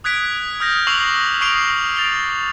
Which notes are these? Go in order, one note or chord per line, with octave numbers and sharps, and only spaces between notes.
D#6 F#6 G#6 B6 D7
D#6 F6 G6 A#6
C#6 D6 E6 C7 F7 F#7
C#6 D#6 C7 D7 F7 G7
A6 D7 F7 G7